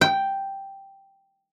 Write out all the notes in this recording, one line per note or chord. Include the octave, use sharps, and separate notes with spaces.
G5